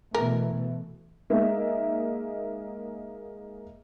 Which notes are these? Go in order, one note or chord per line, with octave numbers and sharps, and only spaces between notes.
B2 E3 A3 A#4
G#3 A#3 D#4 E5